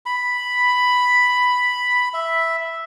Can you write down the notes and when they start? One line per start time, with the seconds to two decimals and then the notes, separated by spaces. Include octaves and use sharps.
0.06 B5
2.14 E5